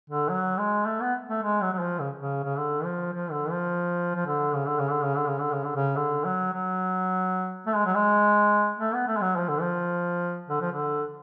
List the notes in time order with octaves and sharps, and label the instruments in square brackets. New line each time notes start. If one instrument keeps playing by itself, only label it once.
[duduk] D3
F#3
G#3
A3
B3
A3
G#3
F#3
F#3
F3
C#3
C#3
C#3
D3
F3
F3
D3
F3
F3
D3
C#3
D3
C#3
D3
C#3
D3
C#3
D3
C#3
D3
C#3
D3
F#3
F#3
A3
G#3
F#3
G#3
A3
B3
A3
G#3
F#3
F3
D3
F3
D3
F3
D3